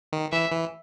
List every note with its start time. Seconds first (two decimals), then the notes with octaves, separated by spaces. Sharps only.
0.13 D#3
0.32 E3 E5
0.51 E3